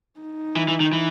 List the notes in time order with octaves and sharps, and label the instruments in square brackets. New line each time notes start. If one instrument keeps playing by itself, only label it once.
[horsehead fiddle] D#4
[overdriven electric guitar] E3
E3
D#3
E3